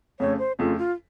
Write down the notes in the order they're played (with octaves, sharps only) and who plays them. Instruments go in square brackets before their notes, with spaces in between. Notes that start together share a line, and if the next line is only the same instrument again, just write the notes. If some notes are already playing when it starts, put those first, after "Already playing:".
[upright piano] F2 C#3 A3 [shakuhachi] C#5
[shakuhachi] C5
[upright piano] F2 C#3 A3 [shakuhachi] F4
[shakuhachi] F4